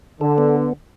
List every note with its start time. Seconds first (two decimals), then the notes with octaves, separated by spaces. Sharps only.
0.21 D3 A4
0.38 B3